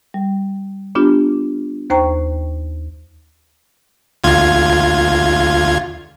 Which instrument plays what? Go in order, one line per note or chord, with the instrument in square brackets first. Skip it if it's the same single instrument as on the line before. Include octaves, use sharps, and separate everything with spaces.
[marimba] G3
B3 D4 F4 G4
D#2 C5 G5 A#5 C#6
[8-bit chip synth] D2 F4 G#6